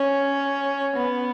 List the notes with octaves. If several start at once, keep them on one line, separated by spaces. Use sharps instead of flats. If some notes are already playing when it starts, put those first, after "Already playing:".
Already playing: C#4
B3